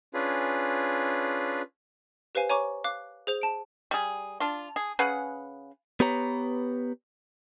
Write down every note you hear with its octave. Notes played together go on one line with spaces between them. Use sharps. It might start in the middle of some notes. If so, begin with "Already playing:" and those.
C#4 D4 F4 G#4 B4
G4 B4 C5 F5 G#5
C#5 G#5 A#5 C#6 D6
F5 D6 F#6
G#4 C5 F7
A5 D7
G3 G#4
D4 F4
G#4
C#3 G#4 B4 F#5
B3 G4 B4 C#5 A#5